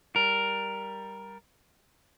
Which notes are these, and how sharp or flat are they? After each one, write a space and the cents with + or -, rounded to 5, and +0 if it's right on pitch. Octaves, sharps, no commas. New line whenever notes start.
G3 +0 A#4 +5